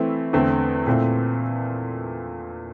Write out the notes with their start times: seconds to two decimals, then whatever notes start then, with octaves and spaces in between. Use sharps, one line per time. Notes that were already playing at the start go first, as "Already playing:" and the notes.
Already playing: E3 A3 C4 E4
0.33 E2 D3 A3 C4
0.87 A#2 A3 C4 E4